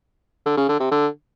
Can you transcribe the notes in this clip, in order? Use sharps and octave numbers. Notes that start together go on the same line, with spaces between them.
D3
C#3
D3
C3
D3